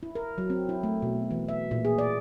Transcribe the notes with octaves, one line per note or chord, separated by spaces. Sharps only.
E4
A#4
F#3
C4
E4
A3
B2
E3
E5
A#2
G#4
D5